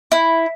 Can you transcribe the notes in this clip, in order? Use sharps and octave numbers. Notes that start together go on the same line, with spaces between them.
E4